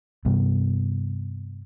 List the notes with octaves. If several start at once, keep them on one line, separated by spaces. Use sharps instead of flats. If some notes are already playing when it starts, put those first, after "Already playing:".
G2 C3 G3 B3